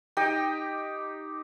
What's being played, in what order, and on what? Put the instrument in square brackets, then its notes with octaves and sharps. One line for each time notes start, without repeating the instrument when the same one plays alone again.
[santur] D#4 G4 G5